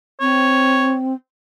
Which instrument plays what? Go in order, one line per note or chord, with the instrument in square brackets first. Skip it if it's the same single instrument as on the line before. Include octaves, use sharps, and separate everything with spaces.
[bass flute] C4 [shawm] C#5